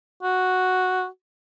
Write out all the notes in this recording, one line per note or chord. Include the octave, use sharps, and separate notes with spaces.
F#4